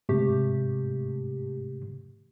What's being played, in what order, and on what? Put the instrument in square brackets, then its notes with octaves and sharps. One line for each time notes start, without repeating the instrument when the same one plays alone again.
[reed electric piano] G#2 C3 [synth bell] A3 G4